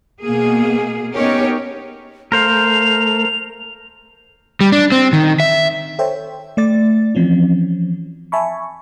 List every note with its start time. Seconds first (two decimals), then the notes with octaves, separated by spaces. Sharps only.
0.22 B2 A#3 G#4
1.15 B3 C#4 D#4 G4 A#4 C#5
2.32 A3 A#4 C5 F5 F7
4.61 G3
4.72 D4
4.92 C4
5.13 D#3
5.40 E5
5.99 A4 C5 C#5 E5 G5
6.57 A3 D5 A6
7.15 E3 F3 C4 C#4
8.32 E5 G#5 A5 B5 C#6